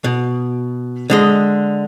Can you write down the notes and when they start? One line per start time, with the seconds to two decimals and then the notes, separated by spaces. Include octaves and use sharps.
0.04 B2
1.10 D3 G#3 D#5